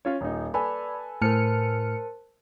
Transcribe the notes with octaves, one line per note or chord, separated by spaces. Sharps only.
C#4 F4 C#5
D#1 D#4
A4 B4 D5 G#5 B5
A2 A#4 C5 A5 F6 C#7